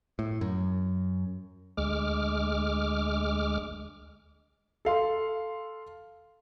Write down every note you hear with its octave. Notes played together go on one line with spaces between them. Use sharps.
A2
F#2
D2 G#3 D6 F6
A4 F5 C6